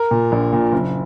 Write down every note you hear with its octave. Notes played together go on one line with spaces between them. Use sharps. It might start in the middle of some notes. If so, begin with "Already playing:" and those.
Already playing: A#4
A#2
A#1
A#2
F#1